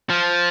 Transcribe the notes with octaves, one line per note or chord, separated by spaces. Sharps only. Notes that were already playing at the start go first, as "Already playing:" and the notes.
F3